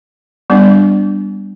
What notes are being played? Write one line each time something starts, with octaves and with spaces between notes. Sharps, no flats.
G3 B3 D4